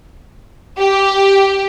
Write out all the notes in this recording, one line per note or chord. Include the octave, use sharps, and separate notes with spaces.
G4